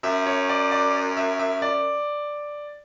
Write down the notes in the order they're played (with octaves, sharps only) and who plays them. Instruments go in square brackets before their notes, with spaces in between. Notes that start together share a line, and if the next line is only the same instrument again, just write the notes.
[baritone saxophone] F#2 [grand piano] E5
[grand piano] C#5
D5
D5
E5
E5
D5